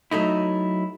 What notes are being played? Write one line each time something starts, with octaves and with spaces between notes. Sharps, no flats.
F#3 A3 D#4 E4